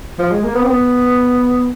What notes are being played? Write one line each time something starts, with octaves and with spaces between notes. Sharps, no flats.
F3
G#3
A#3
B3
C4
B3